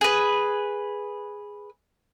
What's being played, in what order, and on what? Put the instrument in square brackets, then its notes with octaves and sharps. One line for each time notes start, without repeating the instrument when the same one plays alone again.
[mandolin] G#4 B4